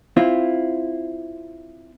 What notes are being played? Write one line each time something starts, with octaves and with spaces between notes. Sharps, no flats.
C4 E4 F4